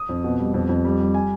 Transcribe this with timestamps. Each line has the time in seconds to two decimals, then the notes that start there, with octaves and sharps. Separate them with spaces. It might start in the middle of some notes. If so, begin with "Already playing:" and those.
Already playing: D#6
0.09 F2
0.24 B2
0.39 G3
0.54 F2
0.69 F2
0.85 G3
1.00 G3
1.14 G#5